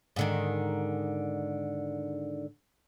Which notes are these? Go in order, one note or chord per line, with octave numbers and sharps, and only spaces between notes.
G#2 D3 D#3